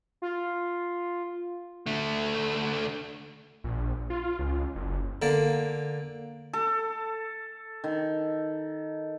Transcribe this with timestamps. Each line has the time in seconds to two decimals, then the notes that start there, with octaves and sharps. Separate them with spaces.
0.22 F4
1.86 D3 A3
3.64 A#1
4.10 F4
4.39 C#2
4.76 F#1
5.22 D3 A#3
6.53 A4
7.84 D#3